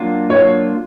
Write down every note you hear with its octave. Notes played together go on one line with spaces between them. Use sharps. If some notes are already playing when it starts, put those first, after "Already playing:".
Already playing: F#3 A#3 D4 F4
F#3 A#3 D4 F4 C#5